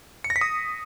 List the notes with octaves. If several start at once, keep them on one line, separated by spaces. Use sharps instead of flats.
C#7
A#6
B6
D#6